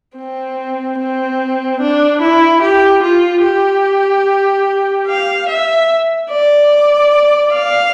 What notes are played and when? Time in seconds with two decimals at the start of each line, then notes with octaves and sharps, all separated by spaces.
0.17 C4
0.99 C4
1.81 D4
2.22 E4
2.63 G4
3.03 F4
3.44 G4
5.07 F5
5.48 E5
6.31 D5
7.53 F5